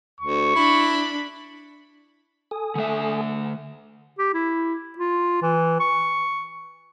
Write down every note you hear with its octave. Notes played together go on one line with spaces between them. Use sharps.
D2 C#6
D4 E4 B5
A4 G#5 D#6
D3 A3 E5
G4
E4
F4
E3
C#6